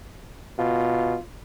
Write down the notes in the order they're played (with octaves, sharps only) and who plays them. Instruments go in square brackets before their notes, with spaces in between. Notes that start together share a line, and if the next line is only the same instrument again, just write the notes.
[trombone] B2 [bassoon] F4